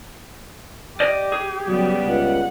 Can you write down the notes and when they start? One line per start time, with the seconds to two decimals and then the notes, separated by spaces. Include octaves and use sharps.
1.00 G4 D5 D#5
1.32 G#4
1.67 C#3 F#3 G3 B3
2.06 C#2 F#5